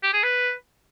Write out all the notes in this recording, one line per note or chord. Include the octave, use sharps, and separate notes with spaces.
G4
G#4
B4